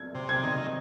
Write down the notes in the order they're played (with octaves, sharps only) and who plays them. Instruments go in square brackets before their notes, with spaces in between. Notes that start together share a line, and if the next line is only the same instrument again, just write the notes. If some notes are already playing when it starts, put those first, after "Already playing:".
Already playing: [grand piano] G#6
[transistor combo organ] C3
[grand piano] G#6
[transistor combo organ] D#3